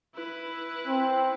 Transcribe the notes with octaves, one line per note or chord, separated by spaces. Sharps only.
E4 B4
C4